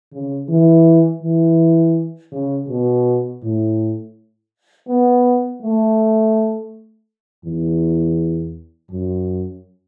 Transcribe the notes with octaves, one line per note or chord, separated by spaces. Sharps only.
C#3
E3
E3
C#3
B2
A2
B3
A3
E2
F#2